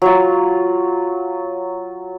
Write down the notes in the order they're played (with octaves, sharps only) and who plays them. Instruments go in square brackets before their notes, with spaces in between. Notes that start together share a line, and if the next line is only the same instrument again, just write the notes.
[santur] F#3 F4